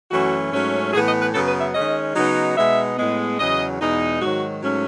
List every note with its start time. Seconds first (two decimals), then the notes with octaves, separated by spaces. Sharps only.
0.11 F#2 E3 A3 C#4 F#4
0.52 G#2 F#3 A3 C#4
0.93 A2 E3 B3 G#4
1.06 D#5
1.21 B4
1.33 F#2 C#3 F#3 B3 A4
1.47 B4
1.61 E5
1.74 D#3 G#3 C#4 D#5
2.15 C#3 F#3 B3 D#4
2.56 B2 G#3 B3 D#4 E5
2.97 A2 G#3 B3
3.39 E2 C#3 F#3 D#5
3.79 E2 B2 G#3 D#4
4.20 G#2 D#3 F#3 F#4
4.61 G#2 F#3 A3 C#4